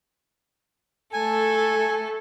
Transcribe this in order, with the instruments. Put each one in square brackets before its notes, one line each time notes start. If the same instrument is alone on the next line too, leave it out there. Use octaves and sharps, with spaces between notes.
[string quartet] A3 A4 [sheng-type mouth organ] G#5